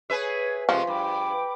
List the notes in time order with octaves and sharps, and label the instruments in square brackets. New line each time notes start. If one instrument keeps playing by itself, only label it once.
[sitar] G#4 B4 E5 [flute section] C#5
[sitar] C3 G#3 A3 [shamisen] F3 [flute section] G4
[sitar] G2 [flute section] G5 B5 D6